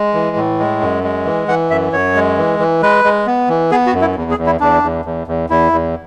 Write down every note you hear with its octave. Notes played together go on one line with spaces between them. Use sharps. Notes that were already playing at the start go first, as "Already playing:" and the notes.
Already playing: G#3
E3
A2
G#3
F#2
G#3
E3
E3 F#5
F#2 E5
F#2 C#5
G#3
E3
E3
G#3 B4
G#3
B3
E3
B3 G#4
F#4
F#2
E4
E2
G#4
E2
E4
E2 D4
E2
E2
E2
E2 E4
E2